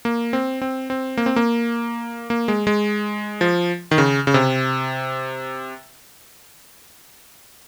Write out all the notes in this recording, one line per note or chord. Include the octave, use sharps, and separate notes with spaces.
A#3
C4
C4
C4
A#3
C4
A#3
A#3
G#3
G#3
F3
D#3
C#3
C#3
C3